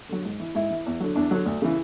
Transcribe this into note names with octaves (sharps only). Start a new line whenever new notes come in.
D3 F#3
G#2
E3
G#2 E4
E3
E2
D3 F#3
E2 D4
D3 F#3
D2
C#3 E3